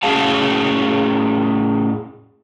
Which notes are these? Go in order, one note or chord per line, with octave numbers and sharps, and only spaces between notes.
A2 C#4 F#4 G#4 F5 A5